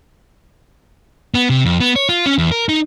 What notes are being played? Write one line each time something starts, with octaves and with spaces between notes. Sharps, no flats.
B3
C3
F2
B3
C#5
F4
C#4
E2
A#4
D#4